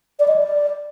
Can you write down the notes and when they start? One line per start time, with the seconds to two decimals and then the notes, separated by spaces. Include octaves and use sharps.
0.19 D5
0.28 D#5
0.36 D5